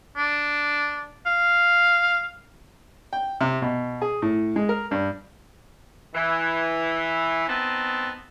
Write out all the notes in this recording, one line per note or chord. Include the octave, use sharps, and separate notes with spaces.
D4
F5
G5
C3
B2
G#4
A2
G#3
A#4
G2
E3
B3 C4 D#4 A5